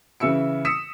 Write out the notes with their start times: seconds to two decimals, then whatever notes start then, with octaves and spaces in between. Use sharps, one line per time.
0.20 C#3 E3 E4 E6 C#7
0.65 D#6 E6 B6 C#7 E7